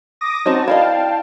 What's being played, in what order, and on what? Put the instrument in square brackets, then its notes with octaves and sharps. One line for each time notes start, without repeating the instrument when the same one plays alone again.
[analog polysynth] D6 D#6 A#6
[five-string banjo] C4 C#4 D#4 [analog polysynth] F#4 A5
[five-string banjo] E4 D5 D#5 [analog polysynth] F5 G5 A5